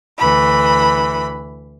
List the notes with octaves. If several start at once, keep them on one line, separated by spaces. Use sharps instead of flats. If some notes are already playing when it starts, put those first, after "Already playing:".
D2 E3 B5